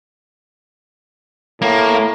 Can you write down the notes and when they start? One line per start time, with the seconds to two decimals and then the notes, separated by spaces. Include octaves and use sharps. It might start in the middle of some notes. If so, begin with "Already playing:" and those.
1.62 A2 A#3